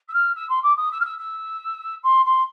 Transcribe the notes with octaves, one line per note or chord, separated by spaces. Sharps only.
E6
F6
E6
C6
D6
D#6
E6
F6
E6
E6
C6
C6